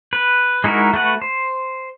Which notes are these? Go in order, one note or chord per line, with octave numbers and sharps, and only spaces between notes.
B4
G#3 D#4 E4 F#4 A#4
A3 F#4 B4 F#5
C5